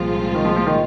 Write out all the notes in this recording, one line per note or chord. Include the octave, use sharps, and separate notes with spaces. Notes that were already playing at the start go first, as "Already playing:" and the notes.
Already playing: C2 A#2 F3 G#3 C4 F4
D#3
F3
F3
D#3